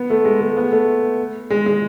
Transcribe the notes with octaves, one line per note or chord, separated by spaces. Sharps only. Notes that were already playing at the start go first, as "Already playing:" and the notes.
Already playing: B3
A3
G#3
A3
B3
A3
G#3
G#3